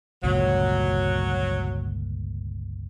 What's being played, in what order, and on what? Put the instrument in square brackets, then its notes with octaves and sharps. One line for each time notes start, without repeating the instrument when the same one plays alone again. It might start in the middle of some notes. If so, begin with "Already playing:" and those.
[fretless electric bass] G1 C#2 A#2 [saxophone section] F#3